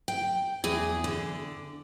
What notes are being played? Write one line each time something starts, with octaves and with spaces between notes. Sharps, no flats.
G5
E2 G#4
D3